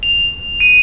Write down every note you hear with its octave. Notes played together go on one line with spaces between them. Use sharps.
F7
D#7